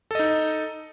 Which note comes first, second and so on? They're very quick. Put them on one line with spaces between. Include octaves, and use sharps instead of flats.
A4 D#5 D#4